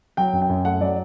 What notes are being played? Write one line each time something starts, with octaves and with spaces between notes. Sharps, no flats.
F#3 G5
F#2
G5
F#2
A3 F#5
F#3 D5